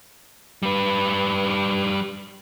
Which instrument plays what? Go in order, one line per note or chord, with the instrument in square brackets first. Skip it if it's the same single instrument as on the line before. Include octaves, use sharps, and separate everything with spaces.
[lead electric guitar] G3 B4